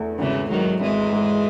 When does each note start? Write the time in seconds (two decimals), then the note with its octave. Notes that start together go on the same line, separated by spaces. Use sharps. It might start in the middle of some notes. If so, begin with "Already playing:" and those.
Already playing: E2 A3
0.19 G#1 C#3 E3
0.50 G#2 D#3 F#3
0.81 G#1 E3 G#3
1.12 G#2